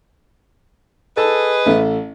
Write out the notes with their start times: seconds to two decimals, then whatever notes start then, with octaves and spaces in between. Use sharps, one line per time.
1.17 G#4 A4 B4 D#5 A5 E6
1.66 A1 A3 E5